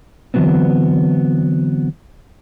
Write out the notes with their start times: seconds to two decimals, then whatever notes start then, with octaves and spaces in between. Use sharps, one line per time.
0.34 D3 E3 F#3 B3 C4